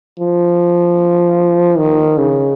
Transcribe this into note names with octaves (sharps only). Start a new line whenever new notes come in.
F3
D#3
C#3